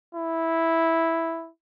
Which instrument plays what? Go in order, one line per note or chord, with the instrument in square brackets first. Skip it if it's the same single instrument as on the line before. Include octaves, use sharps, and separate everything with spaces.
[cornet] E4